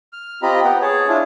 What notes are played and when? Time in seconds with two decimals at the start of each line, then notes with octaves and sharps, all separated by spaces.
0.13 F6
0.43 C4 F4 G4 D#5 A#5 B5
0.64 B3 F#5 G5
0.82 G#4 C#5 A5
1.08 D4 E4 F4